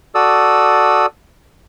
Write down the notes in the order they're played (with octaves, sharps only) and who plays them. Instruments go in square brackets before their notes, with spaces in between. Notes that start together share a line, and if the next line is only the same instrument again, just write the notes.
[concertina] F#4 A4 D5 D#6 E6